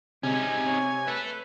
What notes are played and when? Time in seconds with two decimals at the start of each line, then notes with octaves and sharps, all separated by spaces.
0.23 C3 G#3 C#4 D#4 G#5
0.66 C#5
1.08 A4 B4 E5